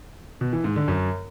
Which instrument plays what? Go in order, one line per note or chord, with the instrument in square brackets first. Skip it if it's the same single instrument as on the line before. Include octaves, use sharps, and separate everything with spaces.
[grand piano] B2
E3
G#2
D3
F#2